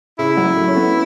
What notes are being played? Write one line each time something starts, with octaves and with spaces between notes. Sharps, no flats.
C#3 E4
F#3
A3
C#4
B3